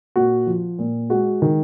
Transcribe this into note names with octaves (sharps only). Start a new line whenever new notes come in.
A#2 F#4
F3
A#2
G#3 F#4
D#3